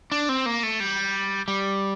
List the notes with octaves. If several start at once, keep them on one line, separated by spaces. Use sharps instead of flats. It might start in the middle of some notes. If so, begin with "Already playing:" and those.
D4
C4
A#3
A3
G3
G3